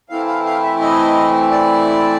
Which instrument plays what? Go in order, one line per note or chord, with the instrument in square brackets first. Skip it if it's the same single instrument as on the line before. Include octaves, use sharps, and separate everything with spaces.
[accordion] E3 A3 C4 E4 F5
F5
F5
E5
D#5
D5